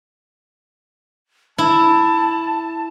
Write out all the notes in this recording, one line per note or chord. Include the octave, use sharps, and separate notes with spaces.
E4 A5